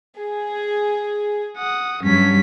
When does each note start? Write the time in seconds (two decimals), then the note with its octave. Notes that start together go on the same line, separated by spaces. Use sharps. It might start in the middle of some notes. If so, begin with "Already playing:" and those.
0.18 G#4
1.58 F#5 D#6
2.04 G2 F#3 C#4 B6